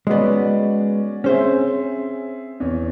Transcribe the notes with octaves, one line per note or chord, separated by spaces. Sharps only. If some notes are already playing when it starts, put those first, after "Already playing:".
G#3 B3 C#4 F#4 D5
C4 C#4 G#4 C5 E5
E2 C#5